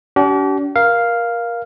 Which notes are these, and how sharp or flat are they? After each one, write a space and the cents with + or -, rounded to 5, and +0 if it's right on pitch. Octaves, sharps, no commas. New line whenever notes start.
D4 -45 G4 -40
A#4 +20 F5 +0